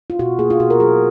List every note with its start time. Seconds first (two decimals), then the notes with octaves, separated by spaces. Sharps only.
0.10 F4
0.19 B2 F#4
0.39 A#3 G#4
0.50 F4
0.60 B2 F#4
0.70 A#4
0.80 F#3 G#4